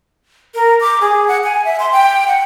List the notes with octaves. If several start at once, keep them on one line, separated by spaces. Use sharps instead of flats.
A#4
D6
G#4
F#5
G#5
E5
C6
G5
F#5